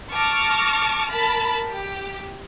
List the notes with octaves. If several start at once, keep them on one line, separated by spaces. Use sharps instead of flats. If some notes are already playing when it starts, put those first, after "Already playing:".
A5 C#6 D6 F6 A#6
A#4 A5 B5
G4